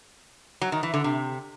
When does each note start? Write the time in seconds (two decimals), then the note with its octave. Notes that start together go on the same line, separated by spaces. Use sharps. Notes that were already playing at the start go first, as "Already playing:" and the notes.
0.61 F#3
0.72 D#3
0.83 E3
0.94 D3
1.04 C3